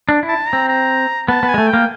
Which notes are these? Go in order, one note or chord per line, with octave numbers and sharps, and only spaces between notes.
D4
E4
A5
C4 A#5
A#5
B3 A5
B3
G#5
G#3
A3
G5
A#3